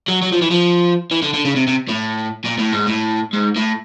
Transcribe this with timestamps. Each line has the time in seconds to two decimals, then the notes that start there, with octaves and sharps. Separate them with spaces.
0.08 F#3
0.23 F#3
0.32 F3
0.42 E3
0.51 F3
1.11 E3
1.22 D3
1.34 D3
1.45 C#3
1.56 C3
1.67 C3
1.89 A2
2.45 A#2
2.58 A2
2.73 G#2
2.87 A2
3.33 G#2
3.56 A2